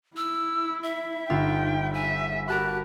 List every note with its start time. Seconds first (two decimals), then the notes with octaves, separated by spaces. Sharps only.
0.17 E4 E6
0.83 E5
1.30 G1 D#4 F4 G5 E6
1.94 E5 G#5
2.48 F#4 G4 A#4 A5 B5 F#6